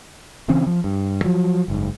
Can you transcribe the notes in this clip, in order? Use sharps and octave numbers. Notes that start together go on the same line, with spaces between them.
C#3 E3 C4 C#4
F3
G2
F3 F#3
F#1 G#2